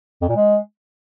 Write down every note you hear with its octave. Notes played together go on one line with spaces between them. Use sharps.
F2
A#2
G#3